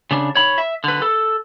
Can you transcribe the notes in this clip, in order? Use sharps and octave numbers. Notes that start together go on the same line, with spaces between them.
C#3 D4
C#5 B5
E5
D3 B4
A4